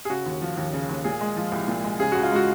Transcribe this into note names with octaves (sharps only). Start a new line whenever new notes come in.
G#4
C#3 F#4
D#2
F3
D#2
C#3
D#2
A#2 G#4
G#3
F3
C2
A#2
G#3
C#3 G#4
C#2 F#4
F4
G#3 F#4